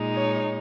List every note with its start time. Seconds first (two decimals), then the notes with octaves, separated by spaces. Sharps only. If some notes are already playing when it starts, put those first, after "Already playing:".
Already playing: A#2 G#3 D#4
0.14 C#5